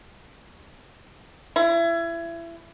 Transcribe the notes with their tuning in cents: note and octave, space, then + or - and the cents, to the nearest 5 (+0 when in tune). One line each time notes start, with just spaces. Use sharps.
E4 +30